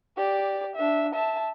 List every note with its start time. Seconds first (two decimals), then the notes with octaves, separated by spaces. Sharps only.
0.17 G4 D5
0.76 D4 E5
1.14 E5 A5